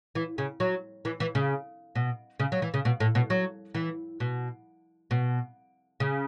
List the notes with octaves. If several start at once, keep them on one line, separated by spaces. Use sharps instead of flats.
E3
C#3
F#3
E3
E3
C#3
B2
C#3
F#3
E3
C#3
B2
A2
B2
F#3
E3
B2
B2
C#3